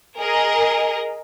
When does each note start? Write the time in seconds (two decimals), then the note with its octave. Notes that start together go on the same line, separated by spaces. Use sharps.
0.18 G#4 A#4 D#5